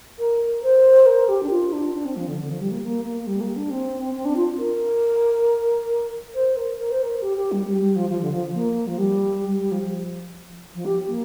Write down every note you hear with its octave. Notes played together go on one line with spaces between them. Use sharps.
A#4
C5
A#4
G4
D4
F4
D4
D4
C4
F3
D3
D3
F3
G3
A#3
A#3
A#3
G3
A#3
D4
C4
C4
D4
F4
A#4
C5
A#4
A#4
C5
A#4
G4
G4
G3
G3
G3
F3
F3
D3
F3
A#3
F3
G3
G3
F3
F3
G4
A#3